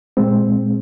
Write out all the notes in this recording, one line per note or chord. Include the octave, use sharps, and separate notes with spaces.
A#2 G#3 C4